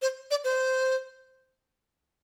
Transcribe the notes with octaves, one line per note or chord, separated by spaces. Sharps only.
C5
D5
C5